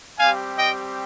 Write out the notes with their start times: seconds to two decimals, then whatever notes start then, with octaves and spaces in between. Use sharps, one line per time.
0.18 G3 C4 G4 F5 G#5
0.57 D#5 G5